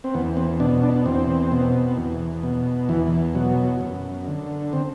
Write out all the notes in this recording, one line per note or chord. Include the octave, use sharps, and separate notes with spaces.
C4
E2 B3
C4
B2 D4
D4
E2 C4
B2
E2
B2
E2 E3
B2 F#3
F#2
D3
C4